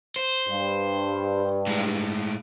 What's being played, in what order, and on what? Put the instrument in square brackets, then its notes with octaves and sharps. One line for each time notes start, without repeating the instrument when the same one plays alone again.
[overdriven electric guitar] C5
[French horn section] G2
[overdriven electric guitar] A2 G#3